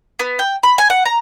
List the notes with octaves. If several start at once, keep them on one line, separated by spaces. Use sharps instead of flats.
B3
G5
B5
G#5
F#5
A#5